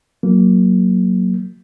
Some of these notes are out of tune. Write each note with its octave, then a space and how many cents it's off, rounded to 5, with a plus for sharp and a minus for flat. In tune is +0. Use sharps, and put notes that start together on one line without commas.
F#3 +0 A#3 +0